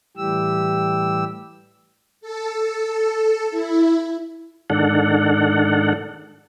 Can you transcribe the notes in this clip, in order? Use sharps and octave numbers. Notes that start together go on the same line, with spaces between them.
A2 E3 G3 G4 E6
A4
E4
G#2 D#3 D4 A4 F#5